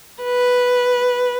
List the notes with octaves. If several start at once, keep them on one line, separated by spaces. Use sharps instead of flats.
B4